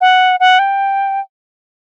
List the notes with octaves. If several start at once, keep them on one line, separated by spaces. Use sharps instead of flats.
F#5
F#5
G5